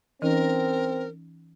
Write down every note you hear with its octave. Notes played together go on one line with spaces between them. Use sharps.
E3 C4 C#4 D#4 A#4